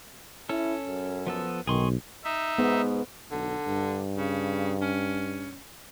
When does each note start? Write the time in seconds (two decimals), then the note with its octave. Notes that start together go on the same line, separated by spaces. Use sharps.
0.49 C#4 E4 A4
0.88 F#2
1.27 F3 B3 A4
1.67 B1 D#3 G#4 C6 C#6
2.24 D#4 E5
2.58 G#2 B3
3.31 B1 D3
3.68 G2
4.17 C#3
4.82 C#4